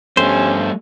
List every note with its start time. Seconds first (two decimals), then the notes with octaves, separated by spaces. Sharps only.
0.17 G2 G3 A3 C#4 C5